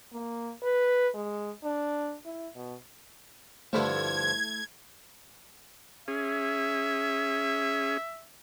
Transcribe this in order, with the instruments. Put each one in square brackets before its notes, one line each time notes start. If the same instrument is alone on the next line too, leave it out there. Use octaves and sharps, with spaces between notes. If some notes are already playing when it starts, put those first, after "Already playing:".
[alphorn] A#3
B4
G#3
D4
E4
B2
[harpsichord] G2 D3 F3 [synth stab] A3 E4 A4 [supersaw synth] G#6
[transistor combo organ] C#4 G#4 [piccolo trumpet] E5